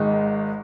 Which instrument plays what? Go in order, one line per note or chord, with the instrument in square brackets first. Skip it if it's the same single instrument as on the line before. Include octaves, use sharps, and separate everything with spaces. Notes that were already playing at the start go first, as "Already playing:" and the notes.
Already playing: [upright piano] G#1 G#2 D#3 G#3 D#4